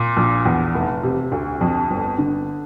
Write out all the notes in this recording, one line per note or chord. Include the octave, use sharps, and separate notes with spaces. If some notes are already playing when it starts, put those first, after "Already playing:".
Already playing: A#2
A#1
E2
F1
C3
D2
F2
G1
D3